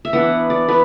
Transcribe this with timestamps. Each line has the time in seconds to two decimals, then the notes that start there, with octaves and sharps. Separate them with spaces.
0.05 E5
0.13 E3 B3 D4 F#5
0.50 D5
0.68 E3 B3 D4 B4